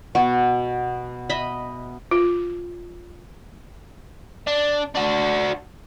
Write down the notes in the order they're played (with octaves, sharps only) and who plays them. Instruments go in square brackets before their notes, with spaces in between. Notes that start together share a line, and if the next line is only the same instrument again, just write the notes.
[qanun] B2 F#4
D#5 E5 B5
[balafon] F4
[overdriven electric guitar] D4
D4 F#4